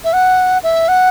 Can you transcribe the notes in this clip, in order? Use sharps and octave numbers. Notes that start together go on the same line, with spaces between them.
E5
F#5
E5
F#5